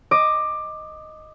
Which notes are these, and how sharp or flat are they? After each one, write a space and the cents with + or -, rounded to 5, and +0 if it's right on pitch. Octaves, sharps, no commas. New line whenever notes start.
D#5 +0 D6 +15